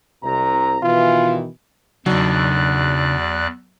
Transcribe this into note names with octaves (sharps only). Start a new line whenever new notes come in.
C2 C3 A#5
B2 D#3 E3 F4
E2 C#3 F#3 D4 D#4 D5 F#6